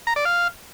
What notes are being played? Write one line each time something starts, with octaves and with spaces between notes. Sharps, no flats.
A#5
D5
F5